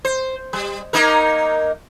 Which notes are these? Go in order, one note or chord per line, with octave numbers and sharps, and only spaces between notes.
C5
G3
A#3 D#4 A#4